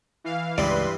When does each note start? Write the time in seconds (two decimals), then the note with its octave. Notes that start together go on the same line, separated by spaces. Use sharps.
0.24 E3 F5
0.58 C#2 G2 E3 G3 B4 D5 C6